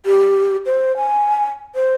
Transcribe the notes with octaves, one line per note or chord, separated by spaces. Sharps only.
G4
C5
G#5
C5